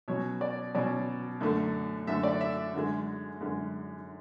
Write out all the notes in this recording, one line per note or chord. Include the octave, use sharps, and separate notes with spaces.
B2 F#3 C#4 C#5
D5
B2 F#3 C#4 D5
F#2 D3 A3
F#2 D3 A3 E5
D5
E5
F#2 D3 G#3
F#2 D3 G#3